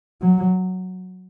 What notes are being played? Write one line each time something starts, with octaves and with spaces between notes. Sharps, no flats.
F#3